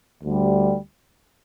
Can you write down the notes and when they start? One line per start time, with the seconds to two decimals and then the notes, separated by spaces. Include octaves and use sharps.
0.23 D2 D3 G3